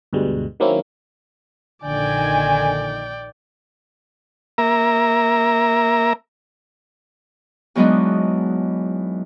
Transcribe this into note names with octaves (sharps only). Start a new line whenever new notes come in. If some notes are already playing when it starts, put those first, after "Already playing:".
D2 G2 B2 G3 G#3
D#3 F#3 A#3 C4 C#4 E4
A#1 D3 D#3 D5 G5 G#5
A#3 A#4 E5 A#5
E2 F#3 G#3 B3 D4 D#4